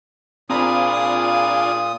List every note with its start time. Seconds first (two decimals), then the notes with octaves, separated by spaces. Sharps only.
0.50 A#2 C4 D4 F4 G#4 A#5 B5 D#6